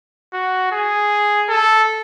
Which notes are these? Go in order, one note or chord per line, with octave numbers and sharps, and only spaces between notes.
F#4
G#4
A4